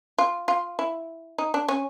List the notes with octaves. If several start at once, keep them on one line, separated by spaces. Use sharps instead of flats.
F4
F4
E4
D#4
D4
C#4